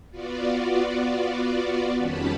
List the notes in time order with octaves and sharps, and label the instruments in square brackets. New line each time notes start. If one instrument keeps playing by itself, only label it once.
[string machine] B3 F4 F#4 D5
F2 D#3 G3 C#4 A5 B5